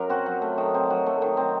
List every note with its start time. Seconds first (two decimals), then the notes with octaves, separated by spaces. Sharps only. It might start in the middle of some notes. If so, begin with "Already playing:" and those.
Already playing: F#2 F#3 A#4
0.10 C4 F#4
0.26 F#3
0.42 A3
0.58 D#3
0.74 C4
0.90 F#3
1.06 A3
1.22 D#3
1.37 C4